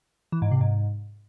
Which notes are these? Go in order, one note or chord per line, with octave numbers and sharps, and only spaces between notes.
E3
G#2
C3
G#2